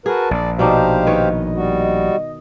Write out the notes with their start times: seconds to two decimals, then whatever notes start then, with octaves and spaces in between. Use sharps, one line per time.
0.06 F#4 G#4 A#4 B4 A5
0.31 A#1 D5
0.59 B2 D4 D#4 G4 C5 D#5 F5
1.07 D#3 B4 C#5
1.55 G3 F#4